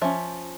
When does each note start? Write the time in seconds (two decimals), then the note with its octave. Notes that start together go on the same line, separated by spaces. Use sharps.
0.02 F3 C#4 E5